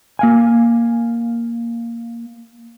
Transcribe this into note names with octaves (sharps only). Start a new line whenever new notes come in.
A#3 F5 G#5